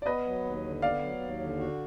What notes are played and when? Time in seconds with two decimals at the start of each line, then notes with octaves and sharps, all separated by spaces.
0.02 D5
0.06 B3 B4 D#5
0.26 F#3
0.44 D#2
0.64 D3
0.82 B3 D5 F5
1.02 F#3
1.20 D#2
1.40 D3
1.59 F#4